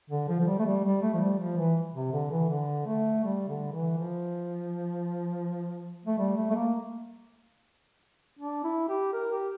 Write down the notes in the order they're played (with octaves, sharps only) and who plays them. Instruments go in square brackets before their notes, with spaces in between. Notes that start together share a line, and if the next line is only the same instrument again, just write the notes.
[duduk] D3
F3
F3
G3
A3
G3
G3
A3
F3
G3
F3
E3
C3
D3
E3
D3
A3
G3
D3
E3
F3
A3
G3
A3
A3
A#3
D4
E4
G4
A#4
G4